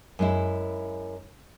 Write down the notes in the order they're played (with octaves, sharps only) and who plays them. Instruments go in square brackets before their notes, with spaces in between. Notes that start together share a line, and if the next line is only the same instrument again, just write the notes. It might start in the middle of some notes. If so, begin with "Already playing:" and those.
[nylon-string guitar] F#2 G#3 E4